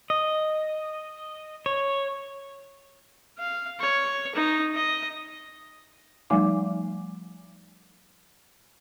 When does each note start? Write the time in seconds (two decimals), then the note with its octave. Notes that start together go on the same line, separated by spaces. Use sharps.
0.10 D#5
1.66 C#5
3.38 F5
3.80 C#5
4.35 D#4
4.75 D#5
6.30 F3 G3 A3 D#4 G#5 D6